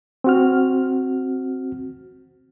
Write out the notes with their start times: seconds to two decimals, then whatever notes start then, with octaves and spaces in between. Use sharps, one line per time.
0.24 C4 F#4 F6